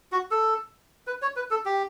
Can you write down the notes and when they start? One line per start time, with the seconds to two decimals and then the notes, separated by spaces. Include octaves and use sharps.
0.12 F#4
0.31 A4
1.07 B4
1.22 C#5
1.36 B4
1.51 A4
1.65 G4